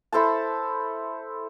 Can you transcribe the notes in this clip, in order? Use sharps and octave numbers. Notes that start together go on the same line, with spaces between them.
E4 A4 C5 A5